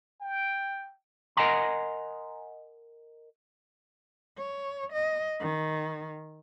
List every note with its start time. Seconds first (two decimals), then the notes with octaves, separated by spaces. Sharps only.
0.21 G5
1.37 A#4 D#5 F#5 G#5 A#5 C6
4.38 C#5
4.93 D#5
5.40 D#3